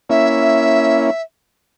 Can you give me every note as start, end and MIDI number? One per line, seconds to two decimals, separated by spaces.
0.10 1.10 58
0.10 1.10 61
0.10 1.10 64
0.10 1.22 76